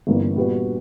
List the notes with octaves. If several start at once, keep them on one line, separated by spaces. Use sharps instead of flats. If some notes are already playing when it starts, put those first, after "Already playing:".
G1 G2 E3 A#3 C#4
A#2 G3 B3 F#4 B4